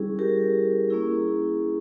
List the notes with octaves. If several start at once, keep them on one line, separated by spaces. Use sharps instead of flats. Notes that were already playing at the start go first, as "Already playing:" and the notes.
Already playing: G3 C#4 E4 G#4
G4 A#4
A#3 C#4 E4 G#4